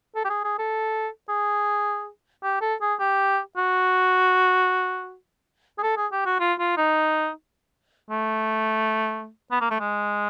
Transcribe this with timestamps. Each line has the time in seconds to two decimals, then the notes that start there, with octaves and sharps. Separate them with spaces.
0.15 A4
0.25 G4
0.30 G#4
0.44 G#4
0.59 A4
1.29 G#4
2.43 G4
2.61 A4
2.81 G#4
3.00 G4
3.57 F#4
5.78 G#4
5.83 A4
5.97 G#4
6.12 G4
6.25 F#4
6.40 F4
6.59 F4
6.77 D#4
8.10 A3
9.51 B3
9.61 A#3
9.70 A3
9.80 G#3